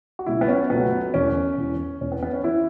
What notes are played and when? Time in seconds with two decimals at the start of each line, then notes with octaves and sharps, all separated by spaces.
0.19 F#4
0.26 C#2 B2 F#3 A3 E4
0.41 B3
0.48 C#4
0.70 C#2 B2 F#3 A3 B3
1.14 E1 E2 E3 C#4
1.57 E1 E2 E3
2.01 E1 E2 E3 C#4
2.12 B3
2.23 B3
2.33 C#4
2.44 E3 E4